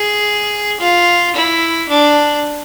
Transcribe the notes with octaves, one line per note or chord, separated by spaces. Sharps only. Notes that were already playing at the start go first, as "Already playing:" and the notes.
Already playing: G#4
F4
E4
D4